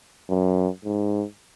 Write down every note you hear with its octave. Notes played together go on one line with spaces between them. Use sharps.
F#2
G#2